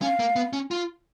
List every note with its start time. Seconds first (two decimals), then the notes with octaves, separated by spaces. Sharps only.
0.02 C#4 F5
0.19 A#3
0.36 B3
0.53 C#4
0.71 F4